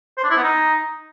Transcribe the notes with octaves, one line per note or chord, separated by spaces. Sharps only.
C5
D4
E4
B3
D#4